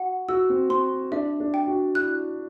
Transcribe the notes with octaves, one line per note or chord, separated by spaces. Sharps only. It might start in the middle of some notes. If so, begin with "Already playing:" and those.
Already playing: F#4 F#5
F#4 E6
C4
C4 C6
D4 E5
D4
G5
F#4
E4 F#6